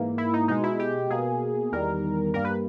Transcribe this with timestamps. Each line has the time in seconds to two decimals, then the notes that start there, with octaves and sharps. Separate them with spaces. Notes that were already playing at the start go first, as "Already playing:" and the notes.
Already playing: G#2 E3 A#3
0.18 E4
0.33 D#4
0.48 B2 G#3 D#4
0.63 E4
0.79 G4
1.10 B2 A#3 G#4
1.72 E2 D#3 G3 A#4
2.34 G2 G3 A#3 A#4
2.44 B4